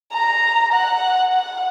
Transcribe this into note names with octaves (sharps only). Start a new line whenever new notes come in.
A#5
F#5
F#5